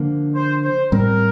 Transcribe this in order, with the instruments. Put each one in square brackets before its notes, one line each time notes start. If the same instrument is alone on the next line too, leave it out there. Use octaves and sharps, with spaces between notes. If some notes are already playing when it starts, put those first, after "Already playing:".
Already playing: [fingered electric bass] D3 F3 A#3 D4
[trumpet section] C5
C5
[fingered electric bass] A2 G3 C4 [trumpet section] A#4